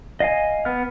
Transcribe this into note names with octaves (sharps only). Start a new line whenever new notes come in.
D#5 F5 G#5
B3 F6